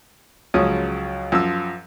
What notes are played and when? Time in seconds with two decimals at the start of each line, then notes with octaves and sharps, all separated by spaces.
0.54 C#2 F3 F#3 C#4 D#6
1.32 F#2 F3 E6